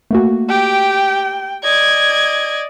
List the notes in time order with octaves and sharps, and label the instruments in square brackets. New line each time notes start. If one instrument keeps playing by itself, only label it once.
[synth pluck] A3 A#3 F#4
[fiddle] G4 [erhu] G5
[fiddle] D5 D#5 [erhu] G#6